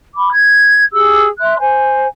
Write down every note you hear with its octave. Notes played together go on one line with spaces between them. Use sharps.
B5 D6
G#6
G4 G#4 E6
E5 C6 F#6
C5 G#5